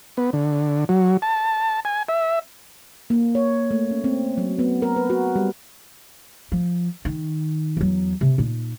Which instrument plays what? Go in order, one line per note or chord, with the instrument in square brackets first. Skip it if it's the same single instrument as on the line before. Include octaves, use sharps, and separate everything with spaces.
[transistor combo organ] B3
D3
F#3
A5
G#5
E5
[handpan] A#3
C#5
A3
C#4
C4
F#3
B3
A#4
B4
F#4
G3
[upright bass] F3
D#3
E2 F#3
C3
A#2 D#4